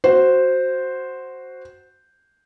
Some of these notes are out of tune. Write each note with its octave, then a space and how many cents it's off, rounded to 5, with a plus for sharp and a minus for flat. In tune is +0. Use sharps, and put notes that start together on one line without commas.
F#4 +0 C5 +0